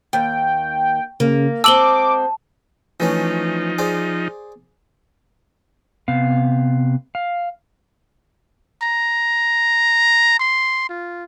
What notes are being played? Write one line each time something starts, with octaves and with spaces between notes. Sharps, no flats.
D#2 G5
C#3 A#3
G#3 C4 A5 D6 E6 F#7 G7
E3 F3 A3 C#4 D#4
G#4 C5 D5
C3 B3 F5
F5
A#5
C6
F4